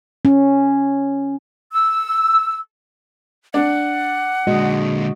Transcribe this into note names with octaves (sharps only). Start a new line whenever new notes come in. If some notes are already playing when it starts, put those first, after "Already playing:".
C#4
E6
D4 F#5
A#2 D3 G#3 F#4 D#5